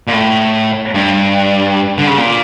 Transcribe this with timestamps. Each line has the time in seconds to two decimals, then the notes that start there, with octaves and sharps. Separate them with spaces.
0.07 A#2
0.13 A2
0.94 G2
1.98 D3
2.07 C#3
2.18 A#2